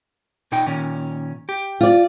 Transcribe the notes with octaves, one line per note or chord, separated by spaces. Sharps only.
A#2 D#4 G5
A#2 D#3 C#4
G4
F4 D5